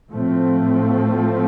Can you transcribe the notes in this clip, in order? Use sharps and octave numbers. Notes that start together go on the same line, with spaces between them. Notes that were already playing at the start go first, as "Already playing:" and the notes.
A2 F3 A3 C4